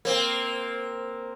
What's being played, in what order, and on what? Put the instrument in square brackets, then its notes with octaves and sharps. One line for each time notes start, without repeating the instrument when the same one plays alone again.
[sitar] A#3 C4